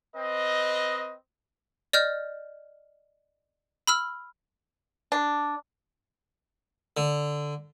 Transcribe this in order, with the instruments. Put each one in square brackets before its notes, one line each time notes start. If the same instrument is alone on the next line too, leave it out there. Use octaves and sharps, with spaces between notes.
[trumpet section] C4 B4 D#5
[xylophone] D5 D#5 F6 G6
B5 E6 F6
[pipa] D4
[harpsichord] D3